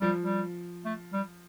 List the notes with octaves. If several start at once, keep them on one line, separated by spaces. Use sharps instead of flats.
F3 G3
G3
A3
G3